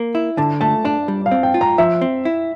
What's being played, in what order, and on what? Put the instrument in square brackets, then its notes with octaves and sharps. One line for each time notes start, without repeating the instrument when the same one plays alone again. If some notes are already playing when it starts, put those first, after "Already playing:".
Already playing: [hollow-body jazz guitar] A#3
E4
[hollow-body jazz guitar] D3 [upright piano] A5
[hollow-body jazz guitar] A3 [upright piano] A5
[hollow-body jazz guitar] D4 [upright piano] A5
[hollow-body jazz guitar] G3
[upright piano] F5
[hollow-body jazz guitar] C4
[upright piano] G5
[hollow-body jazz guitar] F4
[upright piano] A#5
[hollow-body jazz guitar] F3 [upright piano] E5
[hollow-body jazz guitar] C4
E4